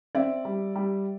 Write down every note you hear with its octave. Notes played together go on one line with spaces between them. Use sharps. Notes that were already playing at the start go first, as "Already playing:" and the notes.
C4 D5 E5
G3
G3